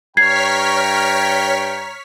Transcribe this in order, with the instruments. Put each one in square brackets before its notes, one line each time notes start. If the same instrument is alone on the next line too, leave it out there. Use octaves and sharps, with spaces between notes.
[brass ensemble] G2 G5 [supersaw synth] C#5 F6 B6 [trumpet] A#5 [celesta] G#6 C7